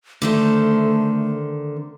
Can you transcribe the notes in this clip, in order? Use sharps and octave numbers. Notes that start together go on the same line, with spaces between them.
D3 D#3 A3 C5